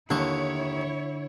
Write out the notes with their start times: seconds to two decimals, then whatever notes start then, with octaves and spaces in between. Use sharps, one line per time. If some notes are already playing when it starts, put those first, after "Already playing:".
0.10 D#2 D3 D#3 E4 C#5 C#6